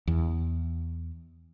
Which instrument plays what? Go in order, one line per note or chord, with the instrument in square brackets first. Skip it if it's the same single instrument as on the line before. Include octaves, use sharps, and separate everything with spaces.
[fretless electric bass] E2